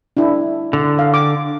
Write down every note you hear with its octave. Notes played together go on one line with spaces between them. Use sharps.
D4 E4
D3
F5
D6